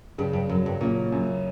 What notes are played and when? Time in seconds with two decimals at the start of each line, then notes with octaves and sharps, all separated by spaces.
0.18 G2 C#3
0.33 G2
0.49 F#2 F#3
0.66 G2
0.81 A#2 C#4
1.12 F#2